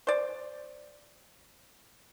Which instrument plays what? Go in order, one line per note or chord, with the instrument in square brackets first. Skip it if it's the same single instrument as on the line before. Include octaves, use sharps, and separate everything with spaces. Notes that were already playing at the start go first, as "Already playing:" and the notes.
[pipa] C5 D5